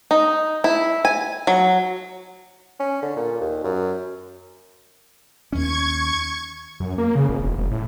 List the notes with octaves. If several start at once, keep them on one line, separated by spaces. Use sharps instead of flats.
D#4
E4
G#5
F#3
C#4
D3
A#2
D#2
F#2
D#2 C#4 C#6 G#6
F#2
A#3
C#3
G#1
E1
F#1
A2